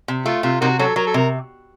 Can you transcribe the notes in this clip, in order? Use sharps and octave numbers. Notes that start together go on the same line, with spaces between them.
C3
A3 F4
C3 F4
C3 A#3 D#4 F#4
F#3 C#4 F#4 A4
F#3 A#4
A4
C3 A#4